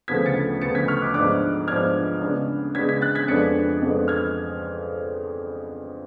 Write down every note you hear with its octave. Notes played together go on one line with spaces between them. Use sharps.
D2 C#3 F3 B3 G#6 B6
A6 C#7
D2 C#3 F3 B3 A6 C#7
G#6 B6
C#6 F6
D6 F#6
G#2 F3 B3 D4 D6 F#6
G#2 F3 B3 D4 F6 G#6
C#3 G#3 B3 D4
C#3 G#3 B3 D4 G#6 B6
G#6 B6
F#6 A6
G#6 B6
F2 F3 G#3 B3 D4 A6 C#7
F2 F3 G#3 B3 D4
F6 G#6